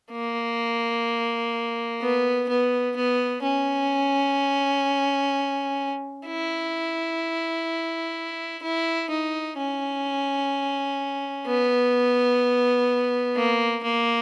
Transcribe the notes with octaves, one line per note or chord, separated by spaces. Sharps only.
A#3
B3
B3
B3
C#4
E4
E4
D#4
C#4
B3
A#3
A#3